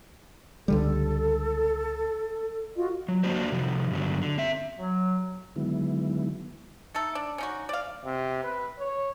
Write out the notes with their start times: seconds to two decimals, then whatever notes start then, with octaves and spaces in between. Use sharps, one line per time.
0.68 C#2 D3 G3 A4
2.76 F4 F#4 D#5
3.08 F#3
3.24 A#3 D4 F4 F#4 C5
3.52 C3 D#3 F3
3.91 G2 D3 F#3
4.22 D3
4.38 C4 E5
4.79 F#3
5.56 D3 D#3 F#3 G#3 B3 E4
6.94 A3 D#4 A4
7.15 D4
7.38 C#4 D#4 F#4
7.69 D5 F5
8.05 C3
8.44 B4
8.79 C#5